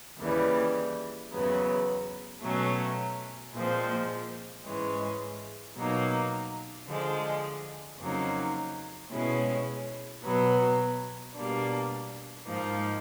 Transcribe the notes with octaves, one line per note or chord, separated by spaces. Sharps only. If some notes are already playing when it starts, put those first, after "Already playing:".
D#2 C#3 E3 G3
E2 C#3 F#3 B3
B2 F#3 A3 C#4
A#2 F3 G#3 C4
G#2 E3 G#3 C#4
B2 F#3 A#3 D#4
D3 F3 G#3
F2 C#3 F#3 A#3 D#4
B2 G#3 C#4 E4
B2 F#3 B3
B2 G3 A#3 D4
G#2 F3 A#3 D#4